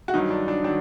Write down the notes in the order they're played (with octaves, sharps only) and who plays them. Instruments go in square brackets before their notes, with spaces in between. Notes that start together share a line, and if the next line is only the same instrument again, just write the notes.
[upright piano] F#4
G2 D#3 F#3 D#4
D4
D4
D#3 F#3 D4